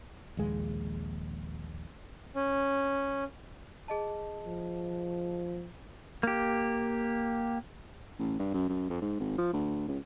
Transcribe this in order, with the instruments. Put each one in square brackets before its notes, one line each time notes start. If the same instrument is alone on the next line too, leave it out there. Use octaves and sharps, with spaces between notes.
[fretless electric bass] A#1 D#2 G#3
[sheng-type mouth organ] C#4
[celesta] G#4 D#5 A5
[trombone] F3
[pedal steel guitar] A#3 G4
[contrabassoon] A1
G2
F#2
F#2
F2
G#2
G#1
F3
D2
C#2